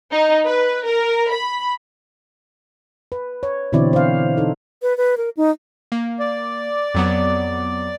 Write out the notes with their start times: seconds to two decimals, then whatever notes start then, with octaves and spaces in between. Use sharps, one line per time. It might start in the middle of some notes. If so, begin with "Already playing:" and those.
0.12 D#4
0.46 B4
0.86 A#4
1.32 B5
3.12 B4
3.43 C#5
3.73 B2 D3 E3 C4 E4 D5
3.93 C5 F5
4.37 D#4 A4
4.82 B4
4.97 B4
5.17 A#4
5.37 D#4
5.92 A#3
6.20 D5
6.94 F2 F#3 B3